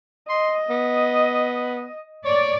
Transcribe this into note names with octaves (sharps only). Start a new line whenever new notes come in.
D#5 C6
B3
C#5 D5